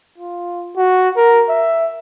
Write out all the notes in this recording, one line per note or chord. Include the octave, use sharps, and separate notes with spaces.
F4
F#4
A#4
E5